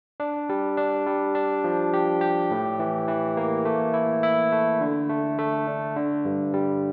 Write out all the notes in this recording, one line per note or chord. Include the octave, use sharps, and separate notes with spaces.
D4
G3
D4
G3
D4
F3
G4
G4
A2
E3
E3
A#3
A3
E4
E4
A3
D3
A3
A3
D4
D3
G2
G3